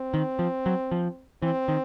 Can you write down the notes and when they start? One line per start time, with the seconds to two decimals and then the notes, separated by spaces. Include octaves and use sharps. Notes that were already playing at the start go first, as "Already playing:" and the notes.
Already playing: C4
0.14 D#3
0.39 F3
0.66 F#3
0.92 F3
1.42 E3 C4
1.68 D#3